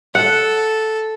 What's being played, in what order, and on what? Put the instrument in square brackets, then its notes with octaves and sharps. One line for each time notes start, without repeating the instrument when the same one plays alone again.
[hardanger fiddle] A4 [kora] F#5